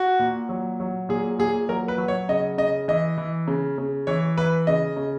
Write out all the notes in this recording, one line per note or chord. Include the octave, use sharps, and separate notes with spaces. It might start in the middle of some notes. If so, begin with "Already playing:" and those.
Already playing: F#4
A#2
F#3
F#3
A#2 G#4
A#2 G#4
F#3 A#4
B4
F#3
C#5
C#3 D#5
C#3 D#5
E3 D#5
E3
C#3
C#3
E3 C#5
E3 B4
C#3 D#5
C#3